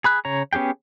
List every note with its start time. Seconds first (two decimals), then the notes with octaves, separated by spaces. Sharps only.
0.04 G#4 B5 F#6
0.25 C#3 C#5 A#5
0.53 B3 C#4 G4 G#4 G5